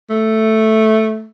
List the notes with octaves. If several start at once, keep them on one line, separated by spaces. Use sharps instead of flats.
A3